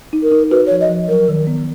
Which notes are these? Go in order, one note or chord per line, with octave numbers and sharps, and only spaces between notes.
D#4
A#4
D#4
F#4 B4
F3 C#5
D#5
F3
F#3 A#4
D#3
B3